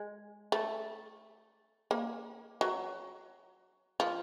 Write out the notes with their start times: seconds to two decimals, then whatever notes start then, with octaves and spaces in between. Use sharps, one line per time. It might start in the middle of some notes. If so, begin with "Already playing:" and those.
Already playing: G#3
0.52 A3
1.91 A#3
2.61 F#3
4.00 F3